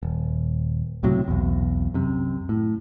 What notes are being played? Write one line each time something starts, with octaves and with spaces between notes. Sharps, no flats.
D#1
C#2 A2 C3 F#3
B1 E2
F#2 C3
A2